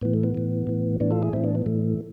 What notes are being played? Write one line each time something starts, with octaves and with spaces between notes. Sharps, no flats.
A2 E3 B3
A3
B3
A2 E3
A2 E3
A2 E3 B3 D4
F4 A4
E4 G#4
A2 E3 C4 E4
B3 D4
B3
A2 E3 A3